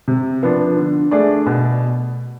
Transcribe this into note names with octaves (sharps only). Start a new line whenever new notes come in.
C3
F3 B3 D4
D3
A3 D4 G#4 D5
B2